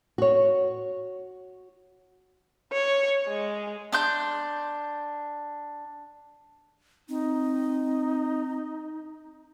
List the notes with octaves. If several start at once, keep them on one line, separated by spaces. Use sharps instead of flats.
F#4 C#5
C#5
G#3
D4 C6 G6
C4 D#4